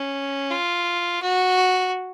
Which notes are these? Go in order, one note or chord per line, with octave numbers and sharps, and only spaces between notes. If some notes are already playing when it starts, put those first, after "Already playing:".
Already playing: C#4
F4
F#4